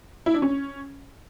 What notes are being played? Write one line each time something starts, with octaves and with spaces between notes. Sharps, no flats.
E4
D4
C#4